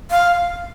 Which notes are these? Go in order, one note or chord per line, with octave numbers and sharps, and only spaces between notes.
F5